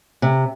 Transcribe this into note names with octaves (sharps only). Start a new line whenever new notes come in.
C3